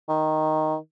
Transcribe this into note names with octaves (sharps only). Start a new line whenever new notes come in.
D#3